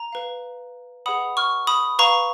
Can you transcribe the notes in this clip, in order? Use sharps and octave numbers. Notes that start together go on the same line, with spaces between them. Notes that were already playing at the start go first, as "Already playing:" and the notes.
Already playing: A#5
B4 F5
G#4 B4 D#5 F#5 B5 D#6
C#6 F6
B5 D#6
B4 F5 A#5 C#6